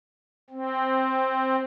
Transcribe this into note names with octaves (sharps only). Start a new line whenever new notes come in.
C4